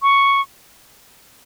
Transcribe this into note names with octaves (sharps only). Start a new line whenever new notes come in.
C#6